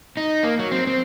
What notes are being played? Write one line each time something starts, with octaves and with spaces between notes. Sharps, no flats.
D#4
A#3
F#3
C4
C4